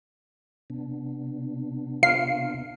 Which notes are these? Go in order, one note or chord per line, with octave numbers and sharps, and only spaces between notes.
C3 B3 D4
F5 C7